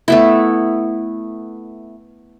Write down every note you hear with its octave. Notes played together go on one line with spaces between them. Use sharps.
A3 B3 E4